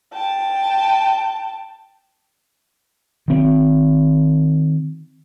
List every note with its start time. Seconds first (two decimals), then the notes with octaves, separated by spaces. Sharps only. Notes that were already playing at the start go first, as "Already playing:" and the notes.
0.14 G5 A5
3.28 D#3 C4